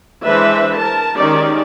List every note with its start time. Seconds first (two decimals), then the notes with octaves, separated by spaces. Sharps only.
0.25 E3 G#3 D4 B4 C5 E5
0.78 A#4 A5
1.16 D#3 G#3 C#4 D#4 G4 D5